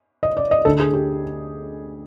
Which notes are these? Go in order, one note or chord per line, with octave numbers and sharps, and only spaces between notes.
D#5
D5
D#5
D2 D3 A4
G#4
G4